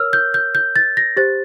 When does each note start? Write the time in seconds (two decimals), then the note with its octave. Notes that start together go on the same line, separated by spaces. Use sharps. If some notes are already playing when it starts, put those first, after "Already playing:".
Already playing: A#4 C#5 E6 F6
0.13 G6
0.34 G6
0.55 G6
0.76 A6
0.97 A#6
1.17 G4 C5 A6